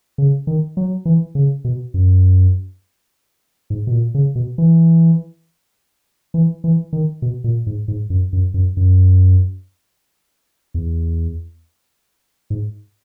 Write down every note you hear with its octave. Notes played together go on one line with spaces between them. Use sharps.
C#3
D#3
F#3
E3
C#3
B2
F#2
G#2
B2
A#2
C#3
B2
E3
E3
E3
D#3
B2
A#2
G#2
G#2
F#2
F#2
F#2
F#2
E2
G#2